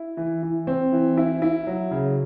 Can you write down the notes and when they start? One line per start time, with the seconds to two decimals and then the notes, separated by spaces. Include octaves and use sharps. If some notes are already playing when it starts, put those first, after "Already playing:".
Already playing: E4
0.17 E3
0.43 E3
0.67 C4
0.92 E3
1.17 E4
1.42 E4
1.67 F#3
1.91 C#3